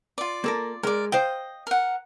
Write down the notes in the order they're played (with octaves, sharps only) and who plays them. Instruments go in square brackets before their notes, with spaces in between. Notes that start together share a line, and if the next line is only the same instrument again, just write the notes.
[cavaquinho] F4 D5
[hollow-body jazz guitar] A#3 A4 A#4
[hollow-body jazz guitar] G#3 [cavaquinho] A#4 D5
[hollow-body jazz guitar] C5 F5 G5 [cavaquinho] D#5
[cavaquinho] A#4 F#5